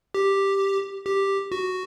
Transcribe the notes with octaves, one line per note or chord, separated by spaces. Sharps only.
G4
G4
F#4